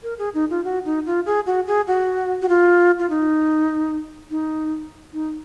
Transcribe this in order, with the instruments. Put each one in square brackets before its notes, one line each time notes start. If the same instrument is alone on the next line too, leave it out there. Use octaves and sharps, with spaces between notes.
[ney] A#4
G#4
D#4
F4
F#4
D#4
F4
G#4
F#4
G#4
F#4
F#4
F4
F4
D#4
D#4
D#4